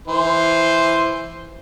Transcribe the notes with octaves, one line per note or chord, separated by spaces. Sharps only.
E3 C5